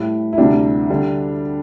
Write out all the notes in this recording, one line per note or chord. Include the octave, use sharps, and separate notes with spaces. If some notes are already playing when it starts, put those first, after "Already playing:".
Already playing: A2 G3 E4
E4
D2 C3 G3 D4
D3 G3